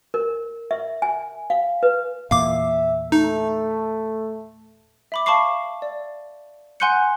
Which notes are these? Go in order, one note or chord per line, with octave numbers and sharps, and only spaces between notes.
A#4
E5
G#5
F5
B4
E2 A#2 E5 F5 D6
A3 D#4
E5 B5 D6
F5 A5 B5 C#6 D6 C7
D5
F#5 G#5 C6 F#6 G6 C#7